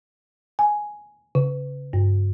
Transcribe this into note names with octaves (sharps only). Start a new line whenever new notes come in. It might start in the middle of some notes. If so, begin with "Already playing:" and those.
G#5
C#3
G2